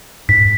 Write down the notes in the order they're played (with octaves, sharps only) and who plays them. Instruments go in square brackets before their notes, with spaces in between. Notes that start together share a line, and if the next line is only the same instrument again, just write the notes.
[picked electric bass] G#2 [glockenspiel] B6